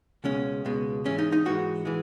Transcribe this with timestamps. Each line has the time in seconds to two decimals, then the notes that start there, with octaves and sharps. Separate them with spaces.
0.24 C#2 B2 G#3 C#4
0.65 C#2 B2 G#3
1.05 G#2 E3 G#3 C#4
1.18 D#4
1.32 D#4
1.45 G#2 E3 G#3 F#4
1.85 E3 G#3